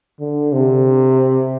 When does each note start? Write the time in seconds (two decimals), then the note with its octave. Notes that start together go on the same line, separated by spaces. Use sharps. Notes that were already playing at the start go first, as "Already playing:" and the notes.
0.20 D3
0.52 C3